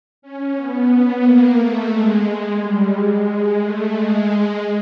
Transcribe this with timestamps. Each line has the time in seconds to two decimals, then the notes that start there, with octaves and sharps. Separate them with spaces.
0.22 C#4
0.56 B3
1.22 A#3
1.56 A3
1.90 G#3
2.58 G3
2.91 G#3
3.59 A3
3.93 G#3